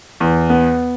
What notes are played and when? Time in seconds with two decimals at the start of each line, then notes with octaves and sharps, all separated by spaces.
0.20 E2
0.50 B3